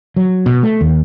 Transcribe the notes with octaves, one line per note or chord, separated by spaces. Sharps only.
F#3
B2
A3
D#2